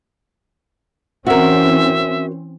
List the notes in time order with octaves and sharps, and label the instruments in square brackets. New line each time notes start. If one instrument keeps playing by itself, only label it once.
[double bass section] E3 C4 C#4 [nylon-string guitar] F#4 A#4 [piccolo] E5